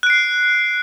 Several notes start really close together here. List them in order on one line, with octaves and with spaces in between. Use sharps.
F#6 D7 C7